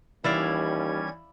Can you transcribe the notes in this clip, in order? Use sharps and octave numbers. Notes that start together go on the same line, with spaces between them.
D#2 E3 G3 C#4 E4 D5 F5 G#6